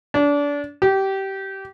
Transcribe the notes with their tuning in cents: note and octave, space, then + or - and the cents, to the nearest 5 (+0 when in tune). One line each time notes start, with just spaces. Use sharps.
D4 -30
G4 -20